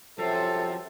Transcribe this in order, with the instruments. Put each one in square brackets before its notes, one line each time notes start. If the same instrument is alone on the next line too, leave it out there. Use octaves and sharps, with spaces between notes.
[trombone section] C2 F#2 C3 [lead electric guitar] F3 [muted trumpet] A4